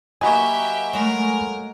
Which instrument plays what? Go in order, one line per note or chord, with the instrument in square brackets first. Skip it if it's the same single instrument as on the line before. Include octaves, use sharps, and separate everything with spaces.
[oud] F#3 [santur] A#3 F#4 D#5 [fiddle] G4 E5 [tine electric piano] G#5 B5
[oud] F#3 G#3 A3 [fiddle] A#4